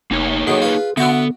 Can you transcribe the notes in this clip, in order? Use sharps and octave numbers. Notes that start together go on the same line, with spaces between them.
F1 A#3 D#4 C#5
A2 D#3 F#3 G#4
F4 B4
D3 B3 D4 F#4 E5